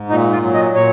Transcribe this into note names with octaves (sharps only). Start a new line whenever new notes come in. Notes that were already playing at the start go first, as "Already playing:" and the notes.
Already playing: G#2
A#2 D#4
F4
F#3
D#5
A#2 C#5